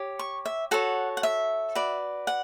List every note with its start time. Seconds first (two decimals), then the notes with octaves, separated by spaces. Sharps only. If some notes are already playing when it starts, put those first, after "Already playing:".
Already playing: G4 C#5
0.19 C#6
0.45 E5
0.71 F#4 A4 C#5 F#5
1.17 F#5
1.23 E5
1.75 F#4 B4 D5
2.27 F#5